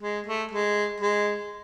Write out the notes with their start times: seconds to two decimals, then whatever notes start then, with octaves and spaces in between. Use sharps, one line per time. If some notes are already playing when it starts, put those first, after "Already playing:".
0.02 G#3
0.26 A3
0.51 G#3
1.00 G#3